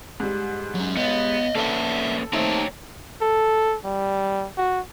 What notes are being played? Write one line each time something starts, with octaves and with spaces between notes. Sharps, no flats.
G#2 G3
F#3 C#4
B3 C#5 D#5
A#3 C#4 A4 B4 D5 E5 G7
A3 A#3 C4 D#4 A4 C#5 G5 A#5
A4
G3
F#4